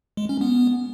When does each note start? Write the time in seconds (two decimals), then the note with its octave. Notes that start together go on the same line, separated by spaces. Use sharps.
0.17 G#3
0.29 C#4
0.41 B3